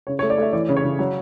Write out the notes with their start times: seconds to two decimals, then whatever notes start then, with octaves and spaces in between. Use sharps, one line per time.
0.07 C#3 C#5
0.19 C#5
0.22 A3
0.30 D5
0.38 A3 E5
0.53 E3 D5
0.69 C#3
0.77 C#5
0.84 C#3
0.99 F#3